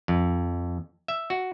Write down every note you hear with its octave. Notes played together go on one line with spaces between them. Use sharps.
F2
E5
F#4